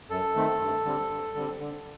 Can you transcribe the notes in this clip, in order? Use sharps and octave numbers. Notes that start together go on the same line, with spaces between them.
F#2 A4
D#3 A3 C4
G2
D3 G3 C4
G2
D3 G3 C4
D3